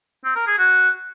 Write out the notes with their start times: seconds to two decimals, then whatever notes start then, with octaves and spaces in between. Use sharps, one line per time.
0.24 C4
0.36 A#4
0.47 G#4
0.58 F#4